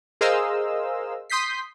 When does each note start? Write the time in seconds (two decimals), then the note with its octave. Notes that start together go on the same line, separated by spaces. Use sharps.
0.21 G#4 A#4 C5 D#5 F5 E6
1.30 C6 D#6 G6 B6 C7